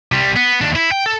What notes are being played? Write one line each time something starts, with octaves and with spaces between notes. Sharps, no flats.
C3 G3
B3
D#2 D4
E4
G5
A4